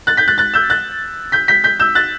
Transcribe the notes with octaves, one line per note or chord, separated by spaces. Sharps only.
F#6 A6
G6 B6
F#6 A6
F#6 A6
E6 G6
F#6 A6
G6 B6
G6 B6
G6 B6
E6 G6
F#6 A6